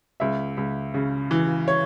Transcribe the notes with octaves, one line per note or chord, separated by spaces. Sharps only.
C#2 E5
C#2
C#3
E3
C#5